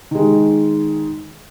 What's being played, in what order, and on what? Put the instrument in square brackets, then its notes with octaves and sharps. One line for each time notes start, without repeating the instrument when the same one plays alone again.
[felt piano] D#3 G#3